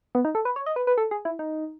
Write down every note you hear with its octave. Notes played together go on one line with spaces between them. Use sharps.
B3
D#4
A4
B4
C#5
D#5
B4
B4
A4
G#4
E4
D#4